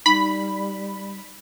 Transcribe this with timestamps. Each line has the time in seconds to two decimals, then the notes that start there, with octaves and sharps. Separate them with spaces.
0.06 G3 D#4 B5